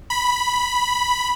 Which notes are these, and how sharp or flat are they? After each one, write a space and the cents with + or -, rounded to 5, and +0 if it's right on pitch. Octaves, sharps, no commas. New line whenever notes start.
B5 -5